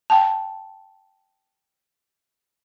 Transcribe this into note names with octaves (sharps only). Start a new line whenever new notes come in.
G5 A5